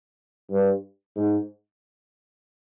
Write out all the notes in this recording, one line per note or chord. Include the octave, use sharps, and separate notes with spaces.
G2
G#2